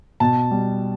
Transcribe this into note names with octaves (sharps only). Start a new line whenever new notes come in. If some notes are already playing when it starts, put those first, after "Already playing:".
B2 A5
G3